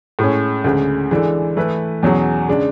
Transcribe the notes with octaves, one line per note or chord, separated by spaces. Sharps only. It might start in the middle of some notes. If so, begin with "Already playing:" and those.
A2 G#3 C#4
D2 C#3 G#3
E3 G#3 D4 A4
E3 A3 E4 B4
E2 B2 F#3 C#4 G#4
C#3 G#3 D4